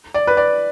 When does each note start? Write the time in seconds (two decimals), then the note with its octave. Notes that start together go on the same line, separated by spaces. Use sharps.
0.14 D5
0.27 B4
0.37 D5